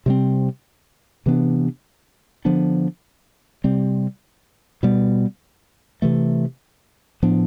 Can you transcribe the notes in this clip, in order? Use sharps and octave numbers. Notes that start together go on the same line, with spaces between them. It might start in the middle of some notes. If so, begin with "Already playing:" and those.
C3 G3 C4
C3 E3 B3 D4
D3 F3 B3 D4
C3 G3 C4
B2 G3 B3
C3 E3 A3
A2 F3 B3 D4